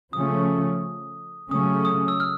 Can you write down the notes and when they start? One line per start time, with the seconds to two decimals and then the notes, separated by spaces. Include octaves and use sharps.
0.13 C#3 F3 A3 C#4 D#6
1.51 C#3 F#3 A3 C#4 D#6
1.85 D#6
2.08 E6
2.20 F6